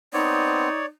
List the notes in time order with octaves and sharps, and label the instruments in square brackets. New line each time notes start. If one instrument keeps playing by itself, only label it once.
[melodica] B3 C4 [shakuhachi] D#4 [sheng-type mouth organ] C#5 D5